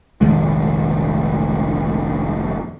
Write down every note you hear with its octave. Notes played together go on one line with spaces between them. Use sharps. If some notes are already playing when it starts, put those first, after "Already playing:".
F1 A#1 D#3 G#3